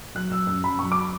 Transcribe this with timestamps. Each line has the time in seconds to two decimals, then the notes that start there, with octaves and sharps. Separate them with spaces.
0.15 F#3 F#6
0.31 F#3 E6
0.47 F#2 E6
0.63 F#2 B5
0.79 F#3 C#6
0.92 D6